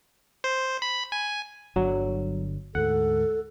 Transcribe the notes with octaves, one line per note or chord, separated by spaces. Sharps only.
C5
B5
G#5
G1 D3 F#3
D2 G#2 A4 F#5